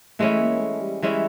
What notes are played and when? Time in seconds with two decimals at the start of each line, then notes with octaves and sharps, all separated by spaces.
0.19 E3 G#3 A3 C#4 E4
0.41 A#3
0.60 A3
0.81 G3
1.02 E3 G#3 C#4 E4